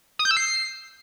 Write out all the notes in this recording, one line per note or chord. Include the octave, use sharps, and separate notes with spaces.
D#6
G6
E6
C7